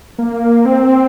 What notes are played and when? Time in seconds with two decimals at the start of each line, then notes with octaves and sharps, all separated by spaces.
0.18 A#3
0.65 C4